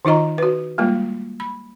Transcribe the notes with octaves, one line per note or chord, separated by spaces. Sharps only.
D#3 D#4 F4 D#5 A#5
F#4 B4
G3 G#3 A#3 F4
B5